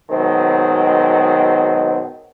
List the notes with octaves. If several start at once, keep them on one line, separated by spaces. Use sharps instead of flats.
B2 D#3 F#3 G#3 C4